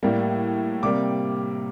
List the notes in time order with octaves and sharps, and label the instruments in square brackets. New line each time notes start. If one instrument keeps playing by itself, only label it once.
[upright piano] A2 G3 A#3
C3 G3 A#3 D6